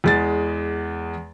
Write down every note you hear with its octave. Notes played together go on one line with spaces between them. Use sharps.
E2 G#3 A6